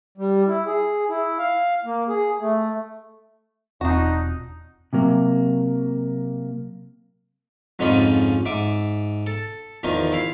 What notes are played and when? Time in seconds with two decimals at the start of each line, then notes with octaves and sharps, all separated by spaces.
0.18 G3
0.47 E4
0.66 G#4
1.09 E4
1.39 F5
1.85 A#3
2.09 G#4
2.40 A3
3.81 E1 C4 D4 D#4 F4 F#4 C#6
4.93 C3 F#3 A#3
7.79 F2 G#2 C#3 F3 D#5 B5
8.45 G#2 E5 D6
9.26 A4
9.83 E2 D#3 F3
10.13 E4 F5